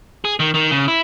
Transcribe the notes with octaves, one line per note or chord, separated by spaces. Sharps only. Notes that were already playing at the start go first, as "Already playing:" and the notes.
G#4
D#3
D#3
C#3
E4